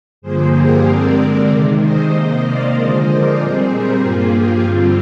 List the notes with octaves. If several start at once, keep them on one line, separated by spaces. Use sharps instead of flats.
G2 D3 F3 A#3 G#4 C5
G4 A#4
D3 G#3 C4 A#4 D5
C3 D#3 G#3
C5 D#5
C3 D#3 A#3 C5 D#5
D5 F5
D3 F3 G#3 C5 D#5
A#4 D5
A#2 G3 C4 G#4 C5
G4 A#4
G2 F3 A#3 F4 G#4
G4
G2 D3 G3 C4 F4